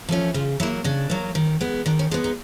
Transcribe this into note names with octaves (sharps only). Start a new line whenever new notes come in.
F3 A3 C#4
C#3 F4
F#3 A#3 E4
C#3 D4
F#3 A#3
D#3
G#3 B3
D#3 D4
C#4
G#3 B3 D4
D#4